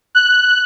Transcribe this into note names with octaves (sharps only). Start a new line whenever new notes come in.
F#6